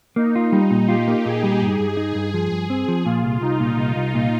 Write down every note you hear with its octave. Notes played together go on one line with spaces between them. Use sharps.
A#3 D#4
F4
G3 D#4
A#2
F4 G4
A#3
A#2 G#4
G3
G2
G2
D#4
G2
F3
G2
C4
F3
A#2 F4
C2
C2 D#4
A#2
C2 D#4
C2
A#2